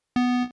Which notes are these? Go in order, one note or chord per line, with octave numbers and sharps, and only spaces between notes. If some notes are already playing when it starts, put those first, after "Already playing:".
B3